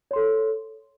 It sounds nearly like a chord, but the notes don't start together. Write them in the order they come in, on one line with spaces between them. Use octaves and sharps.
C#5 C6 A4